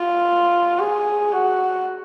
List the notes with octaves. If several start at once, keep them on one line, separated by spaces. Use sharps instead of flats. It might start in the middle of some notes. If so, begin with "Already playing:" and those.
Already playing: F4
G#4
F#4